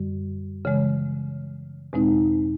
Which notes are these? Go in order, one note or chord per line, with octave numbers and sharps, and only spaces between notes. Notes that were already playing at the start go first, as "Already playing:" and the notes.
Already playing: F#2 D3 G3
C#3 E3 G#3
E2 B2 G#3 C4 D#4